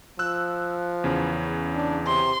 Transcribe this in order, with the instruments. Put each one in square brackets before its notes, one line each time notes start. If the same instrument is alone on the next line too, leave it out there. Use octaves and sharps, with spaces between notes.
[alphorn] F3 [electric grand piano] E6 F#6
[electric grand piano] E2 C#3
[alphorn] D4
[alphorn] C3 [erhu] C6